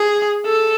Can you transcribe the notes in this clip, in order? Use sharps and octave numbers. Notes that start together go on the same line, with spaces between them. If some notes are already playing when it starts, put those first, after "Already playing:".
Already playing: G#4
A4